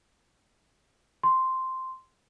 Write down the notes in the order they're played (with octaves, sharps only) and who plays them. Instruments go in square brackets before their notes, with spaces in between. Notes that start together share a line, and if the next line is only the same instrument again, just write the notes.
[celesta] C6